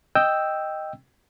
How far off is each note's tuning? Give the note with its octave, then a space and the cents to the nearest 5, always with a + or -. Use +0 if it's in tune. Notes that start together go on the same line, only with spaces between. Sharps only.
D#5 +0 G5 +0 E6 +0